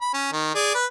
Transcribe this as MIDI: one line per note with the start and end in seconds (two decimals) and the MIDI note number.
0.02 0.10 83
0.14 0.28 61
0.32 0.52 51
0.55 0.75 68
0.55 0.75 74
0.75 0.86 71